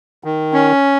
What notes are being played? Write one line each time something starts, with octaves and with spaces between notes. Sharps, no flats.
D#3
C#4